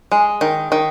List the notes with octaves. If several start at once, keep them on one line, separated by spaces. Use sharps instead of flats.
G#3
D#3
D#3